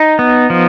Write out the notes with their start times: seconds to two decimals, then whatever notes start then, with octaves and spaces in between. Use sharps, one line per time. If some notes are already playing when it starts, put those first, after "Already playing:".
Already playing: D#4
0.19 B3
0.50 F3